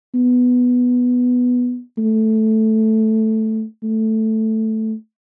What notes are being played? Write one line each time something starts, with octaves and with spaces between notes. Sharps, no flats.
B3
A3
A3